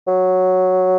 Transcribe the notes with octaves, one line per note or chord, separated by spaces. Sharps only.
F#3